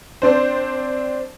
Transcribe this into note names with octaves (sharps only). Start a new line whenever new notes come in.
C4 D4 C5